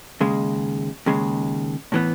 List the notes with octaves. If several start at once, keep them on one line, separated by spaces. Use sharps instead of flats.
D#2 C#3 G#3
D#2 C#3 G#3
A2 E3 B3